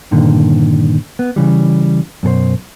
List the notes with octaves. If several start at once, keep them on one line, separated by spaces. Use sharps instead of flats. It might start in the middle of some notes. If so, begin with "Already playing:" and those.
G2 A#2 D3 D#3
B3
C#3 E3 G3
F#2 B2 A4 C5